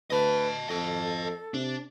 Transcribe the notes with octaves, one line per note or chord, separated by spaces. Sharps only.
D2 B4 D#5 A5
F2 A4 D#5 A5
C3 D4